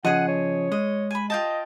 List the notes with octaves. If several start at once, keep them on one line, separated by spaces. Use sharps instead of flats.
C#3 F3 G#4 D#5 F#5
C#5
G#3 D#5
G#5 B5
F4 D#5 G5 A5